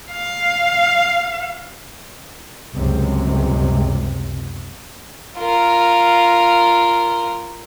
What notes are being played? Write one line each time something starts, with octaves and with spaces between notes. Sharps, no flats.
F5
G1 C#2 F#2 C3
F4 A#4